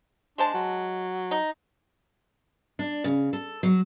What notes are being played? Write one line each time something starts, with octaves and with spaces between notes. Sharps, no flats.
G#3 D4 C5 A5
F#3
D#4
D4
C#3
A4
F#3